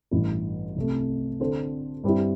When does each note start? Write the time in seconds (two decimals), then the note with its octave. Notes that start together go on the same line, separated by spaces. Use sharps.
0.11 A1 G2 E3
0.76 C2 C3 A3
1.40 D3 C4 A4 C5
2.04 G2 G3 C4 E4 G4